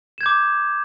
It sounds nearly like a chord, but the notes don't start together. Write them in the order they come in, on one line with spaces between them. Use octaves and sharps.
E7 G#6 G6 D6